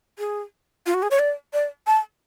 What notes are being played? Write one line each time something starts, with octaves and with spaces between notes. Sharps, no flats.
G#4
F4
F#4
G#4
C#5
D5
D5
A5